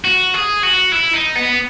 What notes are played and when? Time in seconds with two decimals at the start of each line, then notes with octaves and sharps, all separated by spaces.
0.05 F#4
0.34 G#4
0.63 F#4
0.92 E4
1.13 D#4
1.36 B3